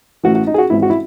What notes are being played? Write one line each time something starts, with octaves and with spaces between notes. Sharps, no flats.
A1 A2 E3 F#4
F#4
D#4
G#4
F#4
G#1 G#2 E3 E4
F#4
E4